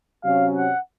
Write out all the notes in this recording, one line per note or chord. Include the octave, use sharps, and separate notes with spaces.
C3 F#3 C#4 F5
F#5